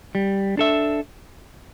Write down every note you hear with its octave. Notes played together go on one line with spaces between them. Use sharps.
G3
D4 A4 E5